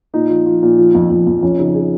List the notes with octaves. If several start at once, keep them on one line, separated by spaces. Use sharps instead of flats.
A#2 D#4
F3
F3
A#2
F3
F2
F2
F2
F2 C#4
C#3 D#4
G#4